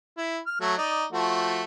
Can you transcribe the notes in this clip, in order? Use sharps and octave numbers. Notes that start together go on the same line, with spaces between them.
E4
F6
F#3 A3
D#4 D5
F3 A3 F#4